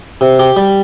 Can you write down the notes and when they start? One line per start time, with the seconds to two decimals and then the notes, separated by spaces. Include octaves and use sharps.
0.21 C3
0.39 G4
0.56 G3